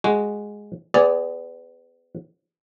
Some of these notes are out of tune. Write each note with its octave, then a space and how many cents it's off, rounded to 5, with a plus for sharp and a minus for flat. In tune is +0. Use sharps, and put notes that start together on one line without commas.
G#3 +0 F#4 +0
B3 +30 G#4 +0 D5 -10